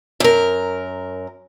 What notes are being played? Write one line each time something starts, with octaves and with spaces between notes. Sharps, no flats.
F#2 A#4